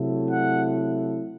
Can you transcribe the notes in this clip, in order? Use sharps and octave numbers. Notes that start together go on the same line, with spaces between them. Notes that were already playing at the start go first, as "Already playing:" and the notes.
Already playing: C3 F#3 A3 E4
F#5